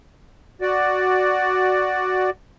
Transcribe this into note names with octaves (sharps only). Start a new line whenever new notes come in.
F#4 D5